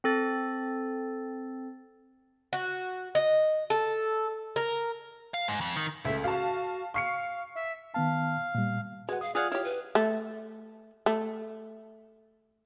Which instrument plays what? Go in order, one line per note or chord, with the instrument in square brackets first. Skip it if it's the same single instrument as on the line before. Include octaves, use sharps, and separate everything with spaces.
[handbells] C4 A4 A6
[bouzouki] F#4
D#5
A4
A#4
[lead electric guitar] F5
G#2
F2
D#3
[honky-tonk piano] C#2 A3 [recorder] E5
[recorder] F#4 [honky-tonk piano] F5 A5
[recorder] F5 [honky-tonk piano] C#6 C7 C#7
[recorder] E5
[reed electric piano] D#3 B3 A5 [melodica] F5
[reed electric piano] A#2 G3
[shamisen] G#3 [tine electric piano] F#4 F#5 [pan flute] B4
[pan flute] F5 [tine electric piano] D#6
[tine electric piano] F4 G#6 [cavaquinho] G#4 F5 F#5 [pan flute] D5
[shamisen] E4 G4 [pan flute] C#5 [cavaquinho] F5
[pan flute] B4
[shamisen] A3
A3